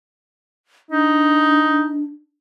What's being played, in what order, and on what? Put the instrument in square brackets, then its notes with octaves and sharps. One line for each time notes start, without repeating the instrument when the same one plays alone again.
[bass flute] D4 [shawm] D#4